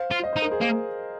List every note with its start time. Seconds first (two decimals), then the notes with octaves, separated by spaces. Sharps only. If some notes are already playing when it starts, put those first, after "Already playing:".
Already playing: C5 F5
0.11 F4
0.23 D#5
0.33 D#4 C5
0.42 A#4
0.52 G#4 C5
0.61 A#3 A#4